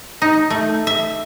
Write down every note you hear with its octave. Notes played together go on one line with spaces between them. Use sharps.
D#4
A3
E5